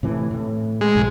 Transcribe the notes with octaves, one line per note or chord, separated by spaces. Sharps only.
A2 C3 E3
A2
G#3
B1 G#2 F3